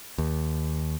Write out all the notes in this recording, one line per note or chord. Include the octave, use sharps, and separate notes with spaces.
D#2